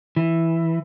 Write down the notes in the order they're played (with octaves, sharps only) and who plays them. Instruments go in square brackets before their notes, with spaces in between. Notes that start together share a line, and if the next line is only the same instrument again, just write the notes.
[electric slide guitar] E3